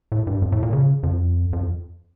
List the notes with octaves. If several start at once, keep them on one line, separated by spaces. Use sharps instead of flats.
A2
G2
F2
A2
A#2
C#3
F2
F2